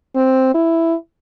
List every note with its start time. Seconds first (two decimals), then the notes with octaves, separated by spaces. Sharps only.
0.16 C4
0.54 E4